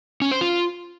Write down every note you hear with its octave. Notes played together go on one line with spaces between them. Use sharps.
C#4
C5
F4